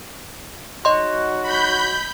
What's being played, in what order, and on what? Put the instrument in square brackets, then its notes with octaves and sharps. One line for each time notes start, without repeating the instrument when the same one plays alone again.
[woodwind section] F#3 D#4 F#4 [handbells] D#5 C6
[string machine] B5 G6